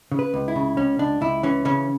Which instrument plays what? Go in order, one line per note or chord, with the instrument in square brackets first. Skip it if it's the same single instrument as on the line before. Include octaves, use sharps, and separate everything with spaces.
[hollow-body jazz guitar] C#3
B4
C#2
E4
C#3
C#2 C#4
C#2 D4
C#2 E4
E3 C#4
C#3 C#4